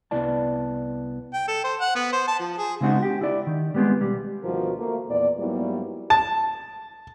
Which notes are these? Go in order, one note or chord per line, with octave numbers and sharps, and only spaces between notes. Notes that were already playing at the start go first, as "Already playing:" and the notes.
C2 B3 E4 D5 A5
G5
A4
C5
F#5
B3
C5
A5
F3
G#4
C#3 G#3 C4 D#4 F#4
G4
E4 D5
D#3
G3 G#3 B3 C4 G#4
B1 G3
D2 B2 D#3 F3 F#4 A#4
A3 A#3
E2 A#2 D5
G#2 F#3 G3 A#3 B3 E4
A5